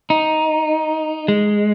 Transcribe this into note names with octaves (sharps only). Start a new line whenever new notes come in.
D#4
G#3